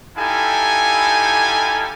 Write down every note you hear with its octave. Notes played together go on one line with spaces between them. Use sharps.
D#4 E4 G4 A4 F5 G#5